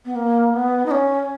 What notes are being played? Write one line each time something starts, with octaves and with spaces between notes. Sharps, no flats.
B3
A#3
B3
D#4
C#4